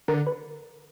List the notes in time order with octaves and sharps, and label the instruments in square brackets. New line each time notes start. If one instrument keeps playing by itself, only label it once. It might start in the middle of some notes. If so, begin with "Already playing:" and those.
[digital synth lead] D3 [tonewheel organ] A#4
[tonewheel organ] B4